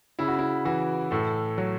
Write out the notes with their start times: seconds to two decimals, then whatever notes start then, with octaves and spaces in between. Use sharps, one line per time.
0.19 C#3 E4
0.28 F#4
0.39 E4
0.65 E3 F#4
1.11 A2 A4
1.58 F#3